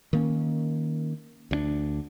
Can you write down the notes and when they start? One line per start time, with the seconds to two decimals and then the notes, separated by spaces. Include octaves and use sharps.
0.13 D#3 A#3 C#4
1.51 D2 A#3 D4